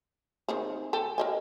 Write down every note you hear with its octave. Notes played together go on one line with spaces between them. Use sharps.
D#3 C4 G#4
A4 G5 G#5
A#4 D#5 G#5